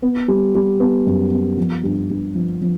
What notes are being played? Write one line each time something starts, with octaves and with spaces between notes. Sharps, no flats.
B3
G3
G3
B3
F#2
B3
F3
G2
G2
F3
F3